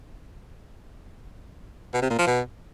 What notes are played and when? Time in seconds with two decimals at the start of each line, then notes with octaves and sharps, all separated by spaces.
1.94 B2
2.02 C3
2.10 A#2
2.18 F3
2.27 B2